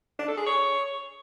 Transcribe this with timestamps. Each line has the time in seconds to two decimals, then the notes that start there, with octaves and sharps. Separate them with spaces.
0.19 D4
0.28 A4
0.37 G#4
0.46 C#5